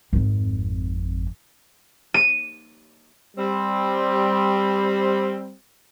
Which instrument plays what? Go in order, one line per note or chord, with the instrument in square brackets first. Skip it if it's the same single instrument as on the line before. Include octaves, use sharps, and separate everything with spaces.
[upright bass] G#1 F2
[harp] D#7
[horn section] G3 C4